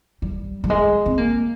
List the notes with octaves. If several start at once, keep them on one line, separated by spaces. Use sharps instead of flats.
G3
G3
G#3
C4
A#3